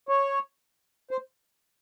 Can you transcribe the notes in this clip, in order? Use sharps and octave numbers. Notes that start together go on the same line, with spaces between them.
C#5
C5